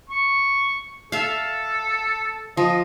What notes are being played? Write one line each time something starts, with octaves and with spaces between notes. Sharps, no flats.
C#6
A4 E5 F5
F3 D#5